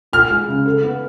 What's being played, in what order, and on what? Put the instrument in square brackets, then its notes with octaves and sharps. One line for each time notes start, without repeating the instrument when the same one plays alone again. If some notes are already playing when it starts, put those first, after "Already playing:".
[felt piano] F4 [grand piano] F6
[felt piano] G#3
C#3
A4
B3